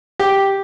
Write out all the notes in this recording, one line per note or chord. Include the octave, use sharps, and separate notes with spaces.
G4